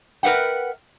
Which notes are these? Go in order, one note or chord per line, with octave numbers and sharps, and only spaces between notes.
A#4 B4 E5 F#5 G5